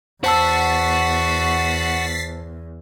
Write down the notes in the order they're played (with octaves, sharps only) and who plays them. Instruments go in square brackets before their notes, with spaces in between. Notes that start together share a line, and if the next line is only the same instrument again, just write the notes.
[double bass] E2 [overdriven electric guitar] F#4 [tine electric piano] C5 A5 E6 [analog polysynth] A6 B6 C7